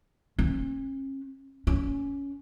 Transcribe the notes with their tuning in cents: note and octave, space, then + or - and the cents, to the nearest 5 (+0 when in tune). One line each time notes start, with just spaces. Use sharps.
C#4 -40
C#4 +10